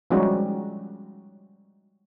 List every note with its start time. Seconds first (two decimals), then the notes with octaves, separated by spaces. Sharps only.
0.11 F3 G3 G#3 C#4 D#4 F#4